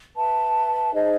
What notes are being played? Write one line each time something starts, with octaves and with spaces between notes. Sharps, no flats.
B4 E5 A5
D#4 G#4 C5 D#5